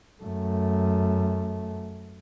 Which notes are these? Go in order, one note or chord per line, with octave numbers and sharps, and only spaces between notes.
F#2 A3